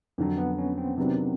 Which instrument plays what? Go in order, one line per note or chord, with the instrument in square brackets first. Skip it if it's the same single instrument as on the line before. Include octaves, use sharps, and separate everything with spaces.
[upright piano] F2 D3 F#3
[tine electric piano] B3
C#4
C4
[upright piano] C3 D#3 F#3 B3 D4